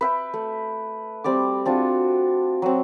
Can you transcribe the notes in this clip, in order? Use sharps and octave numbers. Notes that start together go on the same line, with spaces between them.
B4 E5 G5
A3
G3 C4 D5 D6
C4 D4 F4 F#4
F#3 C4